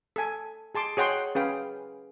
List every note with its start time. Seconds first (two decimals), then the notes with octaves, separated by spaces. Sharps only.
0.16 A4 G#5
0.75 G#4 A5 C6 D6
0.97 G#4 C#5 F#5 G5 C6
1.35 C#4 G#4 B4 F5 G5